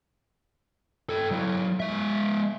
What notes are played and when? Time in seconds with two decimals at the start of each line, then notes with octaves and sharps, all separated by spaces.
1.09 A4 G5
1.31 F#3 E4
1.80 G#3 E5